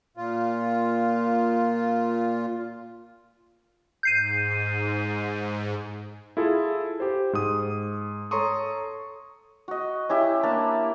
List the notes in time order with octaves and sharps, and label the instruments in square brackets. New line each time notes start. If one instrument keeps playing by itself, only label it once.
[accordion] A#2 F4
[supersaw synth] G#2 [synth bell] G6 C7 D#7
[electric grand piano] E4 F4 G#4 A4
G4 C5
G#2 D#6
A4 C#5 A#5 C6 C#6 D#6
[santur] F#4 D#5
C#4 E4 G4 E5
A#3 D4 A5